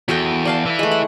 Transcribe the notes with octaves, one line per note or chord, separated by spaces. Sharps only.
E2 F#4 A4 G5
D5 F5 A5
E3 E4
G#3 A3
F#5